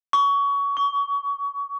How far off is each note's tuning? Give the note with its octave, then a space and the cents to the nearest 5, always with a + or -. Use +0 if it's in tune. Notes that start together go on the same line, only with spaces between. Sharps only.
C#6 +25
C#6 +35